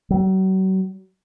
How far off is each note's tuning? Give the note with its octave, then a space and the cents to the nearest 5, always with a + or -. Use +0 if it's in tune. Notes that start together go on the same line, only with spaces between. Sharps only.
F#3 +40